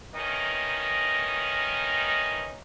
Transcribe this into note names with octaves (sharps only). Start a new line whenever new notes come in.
D#3 E3 C#4 D#4 A#4 D#5